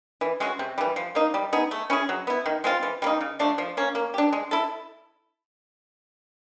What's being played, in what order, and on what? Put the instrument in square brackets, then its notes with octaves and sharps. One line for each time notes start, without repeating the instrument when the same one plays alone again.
[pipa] E3
G#3 C#4 F#4
C3
E3 G3
F3
A#3 D#4
G3
B3 D#4 G#4
A3
C#4 E4 G#4
F#3
B3 E4
D#3
G#3 C4 F4
E3
G3 A#3 D#4
C#3
F3 A3 D4
F3
A#3 C#4
A#3
D4 G4
G#3
E4 A4